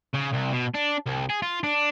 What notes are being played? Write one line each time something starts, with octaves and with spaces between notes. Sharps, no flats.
C#3
C2
B2
D4
C2
G#4
F4
D4